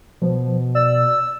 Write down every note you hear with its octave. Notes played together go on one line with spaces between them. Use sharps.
B2 F3
D5 E6